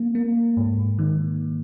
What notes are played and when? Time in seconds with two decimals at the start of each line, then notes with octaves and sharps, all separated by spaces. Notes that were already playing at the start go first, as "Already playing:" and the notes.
Already playing: A#3
0.15 A#3
0.57 G#2
0.99 D#3